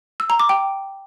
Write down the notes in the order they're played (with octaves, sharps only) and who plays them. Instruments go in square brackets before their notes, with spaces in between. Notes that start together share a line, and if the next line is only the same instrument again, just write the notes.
[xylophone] E6
A#5
D6
G5